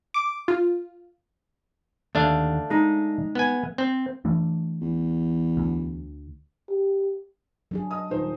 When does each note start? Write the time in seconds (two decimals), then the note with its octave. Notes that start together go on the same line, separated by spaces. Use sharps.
0.14 D6
0.48 F4
2.15 D#2 D3 A3 D4 F5
2.70 G#3 D#4
3.35 B3 G#5
3.78 C4
4.25 E3 A3 D4
4.81 E2
5.57 D2
6.70 G4
7.71 F#3 D4 G#4
7.91 D#5 D#6
8.10 D#1 D#4 C5